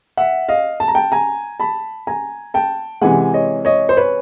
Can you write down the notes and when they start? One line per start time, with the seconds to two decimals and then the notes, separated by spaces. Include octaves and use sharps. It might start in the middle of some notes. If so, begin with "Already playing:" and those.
0.17 E5 F#5
0.49 D#5 F5
0.80 A5
0.88 A#5
0.94 G5 A5
1.12 G#5 A#5
1.60 A5 B5
2.07 G#5 A#5
2.54 G5 A5
3.01 C3 E3 G#3 F#5 G#5
3.34 C#5 D#5
3.65 C#5 D#5
3.89 C5
3.97 B4 C#5